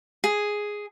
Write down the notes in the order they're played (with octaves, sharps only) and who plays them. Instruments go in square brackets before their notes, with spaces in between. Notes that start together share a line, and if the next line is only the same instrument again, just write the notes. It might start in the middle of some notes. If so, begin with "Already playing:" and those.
[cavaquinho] G#4